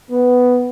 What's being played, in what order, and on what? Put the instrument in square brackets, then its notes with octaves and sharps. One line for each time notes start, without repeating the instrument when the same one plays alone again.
[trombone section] B3